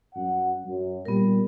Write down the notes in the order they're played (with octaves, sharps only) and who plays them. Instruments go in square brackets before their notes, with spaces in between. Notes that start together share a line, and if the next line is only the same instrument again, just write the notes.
[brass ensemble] F#2 F#5
F#2
[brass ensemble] A#2 G3 [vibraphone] B3 A#4